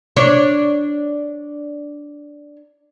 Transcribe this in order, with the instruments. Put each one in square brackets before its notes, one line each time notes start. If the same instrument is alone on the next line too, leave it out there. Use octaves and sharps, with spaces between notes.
[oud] D4 C#5